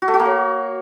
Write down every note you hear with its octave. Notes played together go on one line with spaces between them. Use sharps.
F#4
A3
F#4
A#3
C#5